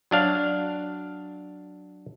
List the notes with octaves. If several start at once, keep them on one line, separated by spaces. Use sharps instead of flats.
F#3 D4 F5